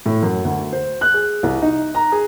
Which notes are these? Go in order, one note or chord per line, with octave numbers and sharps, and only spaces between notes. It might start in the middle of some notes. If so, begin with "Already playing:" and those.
A2
F#2
D2
C5
F#6
G#4
C2
D#4
A#5
G#4